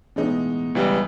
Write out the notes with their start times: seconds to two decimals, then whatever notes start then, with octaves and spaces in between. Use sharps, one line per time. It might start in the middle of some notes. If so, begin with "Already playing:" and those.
0.16 A1 B2 E3 G#3 D#4
0.75 C#2 E3 G3